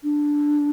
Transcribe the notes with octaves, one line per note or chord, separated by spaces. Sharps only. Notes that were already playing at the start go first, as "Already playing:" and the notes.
D4